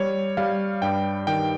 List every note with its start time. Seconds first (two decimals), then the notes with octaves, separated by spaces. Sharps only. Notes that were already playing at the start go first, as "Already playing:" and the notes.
Already playing: G3 C#5
0.37 G3 F5
0.82 G2 G5
1.27 D#3 G5